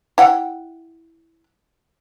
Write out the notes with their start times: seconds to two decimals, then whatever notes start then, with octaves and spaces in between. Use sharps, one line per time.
0.18 E4 F#5 G5